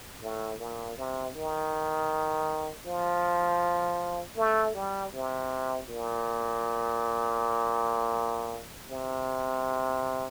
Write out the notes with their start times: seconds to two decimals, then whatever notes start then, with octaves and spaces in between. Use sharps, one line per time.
0.22 A2
0.60 A#2
0.98 C3
1.35 D#3
2.86 F3
4.37 A3
4.75 G3
5.13 C3
5.88 A#2
8.91 C3